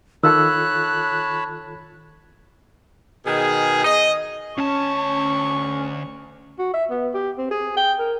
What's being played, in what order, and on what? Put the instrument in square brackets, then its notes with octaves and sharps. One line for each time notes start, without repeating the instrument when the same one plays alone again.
[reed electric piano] D#3 F4 A4 [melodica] C#5 A5 B5 [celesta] E6 [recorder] F#6
[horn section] B2 D#3 G#4
D#5
[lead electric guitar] D2 A5 [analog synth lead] C#4 [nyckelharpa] C#6
[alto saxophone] F#4
E5
B3
G4
C4
G#4
G5
A#4